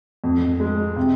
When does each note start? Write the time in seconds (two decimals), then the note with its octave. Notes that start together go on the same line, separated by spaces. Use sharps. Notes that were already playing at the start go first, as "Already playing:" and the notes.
0.24 F2
0.60 G#3
0.96 C3